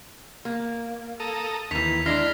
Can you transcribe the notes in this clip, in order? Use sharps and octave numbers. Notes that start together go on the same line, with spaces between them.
A#3
A4 A#5 D#6
D#2 D#3 E3 B6 F7
G#3 D4 E4 F6 A#6 C7